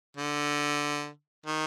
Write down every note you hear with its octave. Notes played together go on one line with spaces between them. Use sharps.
D3
D#3